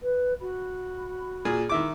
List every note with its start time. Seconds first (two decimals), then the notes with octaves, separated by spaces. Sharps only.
0.02 B4
0.41 F#4 B5
1.45 A#2 G#4
1.69 D#3 E4 E5 D6